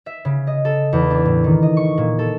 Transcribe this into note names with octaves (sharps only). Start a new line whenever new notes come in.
E5
C#3
D#5
A4
E2
D4
A2
D#3
D#5
C#6
A#2
A4